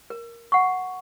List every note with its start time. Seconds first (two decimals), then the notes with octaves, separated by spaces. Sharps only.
0.10 A#4
0.52 F#5 C#6